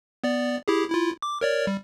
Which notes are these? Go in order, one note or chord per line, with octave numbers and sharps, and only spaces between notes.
B3 D5
E4 G4 G#4
E4 F4
D6
A#4 C#5 D5
G3